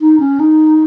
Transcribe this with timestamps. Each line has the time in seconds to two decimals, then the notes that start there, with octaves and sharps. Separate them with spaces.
0.01 D#4
0.20 C#4
0.40 D#4